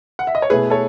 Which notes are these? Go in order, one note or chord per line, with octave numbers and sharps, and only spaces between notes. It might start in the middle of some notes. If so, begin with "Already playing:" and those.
F#5
E5
D#5
C#5
B2 A3 E4 G#4 B4
A4 C#5